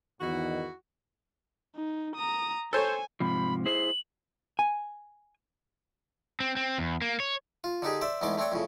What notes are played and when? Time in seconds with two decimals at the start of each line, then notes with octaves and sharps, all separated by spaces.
0.21 E2 G#2 D#3 E4 F#4
1.76 D#4
2.16 A#5 D#6
2.73 A4 C5 C#5 G#5
3.20 G#2 C3 F3 B5
3.65 E4 G#4 C5 F#7
4.59 G#5
6.40 C4
6.57 C4
6.78 E2
7.02 A#3
7.20 C#5
7.64 F4
7.82 D3 D4 D#4 G4 G#4
8.01 C5 D5 E5
8.21 E2 G#2 A3 B3 C6 D6
8.38 A3 C4 D4 C#5 G5
8.52 F2 A2 C#3